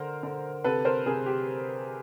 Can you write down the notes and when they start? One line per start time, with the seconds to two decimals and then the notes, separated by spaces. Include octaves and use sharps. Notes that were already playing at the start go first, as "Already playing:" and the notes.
Already playing: D3 A#4 C5
0.23 D3
0.64 C3 A4 B4
0.85 A#4 C5
1.06 C3 G#4 A#4
1.26 G4